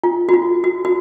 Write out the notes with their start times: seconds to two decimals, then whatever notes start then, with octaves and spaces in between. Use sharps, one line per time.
0.04 F4
0.29 F#4
0.34 F4
0.64 F#4
0.85 F#4